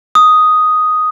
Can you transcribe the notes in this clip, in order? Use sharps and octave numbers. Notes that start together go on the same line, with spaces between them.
D#6